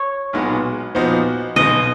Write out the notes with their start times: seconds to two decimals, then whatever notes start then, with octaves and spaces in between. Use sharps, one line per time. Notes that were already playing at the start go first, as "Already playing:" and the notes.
Already playing: C#5
0.33 B1 A#2 G#3 B3 F#4
0.95 A#2 F3 B3 D#4 F#4
1.56 B1 B2 G#3 B3 D#4 D#5